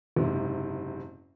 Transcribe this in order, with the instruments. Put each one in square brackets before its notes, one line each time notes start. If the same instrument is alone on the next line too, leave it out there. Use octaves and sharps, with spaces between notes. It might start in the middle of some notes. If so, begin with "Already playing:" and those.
[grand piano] F#1 G#2 C3